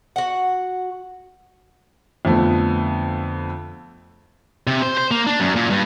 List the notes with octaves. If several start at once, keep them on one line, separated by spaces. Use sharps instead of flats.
F#4 F#5
F2 D3 F3 A3 B3
C3
C5
C5
A#3
D4
F#2
A#2
G2